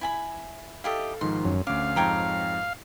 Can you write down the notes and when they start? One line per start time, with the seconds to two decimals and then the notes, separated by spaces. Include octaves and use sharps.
0.01 E4 G#5 B5
0.84 E4 G4 A4 D#5 F5
1.21 G#2 D#3 F3 C6
1.45 F#2
1.67 D2 C#4 F5 D6
1.96 F2 G#2 C#5 G5 A#5